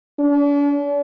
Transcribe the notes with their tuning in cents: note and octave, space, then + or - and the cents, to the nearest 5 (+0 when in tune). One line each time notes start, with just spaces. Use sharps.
D4 -45